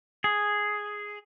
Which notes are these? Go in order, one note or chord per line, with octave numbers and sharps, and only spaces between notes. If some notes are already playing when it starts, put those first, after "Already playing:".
G#4